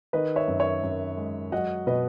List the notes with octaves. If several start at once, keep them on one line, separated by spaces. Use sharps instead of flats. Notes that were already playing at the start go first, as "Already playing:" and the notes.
D#3 B4 D#5
C#5 E5
F#2
C#5 E5
F#2
G#3
F#3 D#5 F#5
B2 B4 D#5